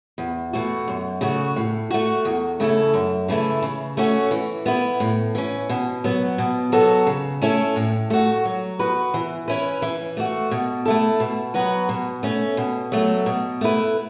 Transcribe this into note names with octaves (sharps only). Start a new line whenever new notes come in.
E2
B2 A3 F#4
F#2
C#3 A3 F#4
A2
A3 F#4
E2
C#3 A3 E4 A4
F#2
C#3 E3 A3 E4
C#3
A3 C#4 F#4
E3
B3 E4 B4
A2
E3 C#4
B2
F#3 B3
B2
F#3 B3 F#4 A4
C#3
A3 C#4 E4 A4
A2
A3 F#4
F#3
B3 F#4 B4
E3
C#4 E4 B4
E3
A3 F#4
B2
A3 E4 A4
B2
F#3 B3 F#4 B4
B2
A3 C#4
B2
F#3 A3
B2
A3 E4 B4